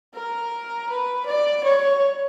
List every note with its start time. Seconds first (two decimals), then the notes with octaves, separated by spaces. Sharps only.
0.14 A#4
0.89 B4
1.26 D5
1.64 C#5